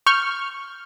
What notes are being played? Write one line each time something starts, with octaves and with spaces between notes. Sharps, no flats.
C#6 F6 G6